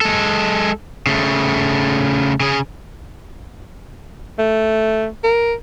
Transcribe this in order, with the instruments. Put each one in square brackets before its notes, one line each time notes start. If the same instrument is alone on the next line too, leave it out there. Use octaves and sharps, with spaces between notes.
[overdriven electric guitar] G#3 A4
C#3 A3
C#3 G#4
[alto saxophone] A3
A#4